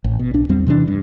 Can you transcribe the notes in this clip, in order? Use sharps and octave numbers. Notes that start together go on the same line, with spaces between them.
A1
B2
B1 D4
E2 G3 C4
C3 E3 G#3 D4
G2